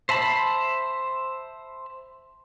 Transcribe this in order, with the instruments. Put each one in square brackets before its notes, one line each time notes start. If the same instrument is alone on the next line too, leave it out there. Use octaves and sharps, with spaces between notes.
[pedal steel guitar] C5 E5 A5 B5